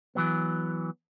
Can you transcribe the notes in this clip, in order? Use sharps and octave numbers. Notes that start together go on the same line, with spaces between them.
E3 F#3 B3